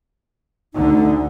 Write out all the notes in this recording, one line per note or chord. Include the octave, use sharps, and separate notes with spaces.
D2 D3 D#4